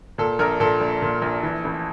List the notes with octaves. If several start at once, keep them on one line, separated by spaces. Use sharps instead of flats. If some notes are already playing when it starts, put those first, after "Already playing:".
A#2 A4
A#1 A#4
A#2 A4
A#1
A#2
A#1
E3
A1